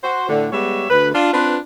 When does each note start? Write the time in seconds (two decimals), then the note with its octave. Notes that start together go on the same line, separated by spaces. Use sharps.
0.04 F#4 C5
0.29 A2 D3
0.52 G3 G#3 B3 G4 C#5 E5
0.90 D2 B4
1.14 D4 F4
1.33 C4 D4 F4 B4